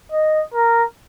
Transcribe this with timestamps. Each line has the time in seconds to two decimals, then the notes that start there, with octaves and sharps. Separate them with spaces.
0.12 D#5
0.54 A#4